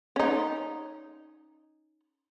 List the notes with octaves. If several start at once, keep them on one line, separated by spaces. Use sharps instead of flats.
C#4 D#4